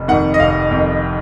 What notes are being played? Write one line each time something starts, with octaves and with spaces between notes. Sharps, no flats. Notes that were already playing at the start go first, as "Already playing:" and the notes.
Already playing: F1
F2 D#3 F#5
D#5
F1 F5
F2 D#3